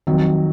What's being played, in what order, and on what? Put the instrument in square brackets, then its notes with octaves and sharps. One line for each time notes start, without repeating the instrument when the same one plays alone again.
[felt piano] F2 D#3 F#3